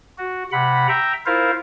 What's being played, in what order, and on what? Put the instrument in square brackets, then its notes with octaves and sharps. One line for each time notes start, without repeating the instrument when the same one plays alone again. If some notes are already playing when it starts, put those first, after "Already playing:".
[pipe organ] F#4
C3 F#5 B5
E5 G5 A#5
E4 F4 A#4 C5 F5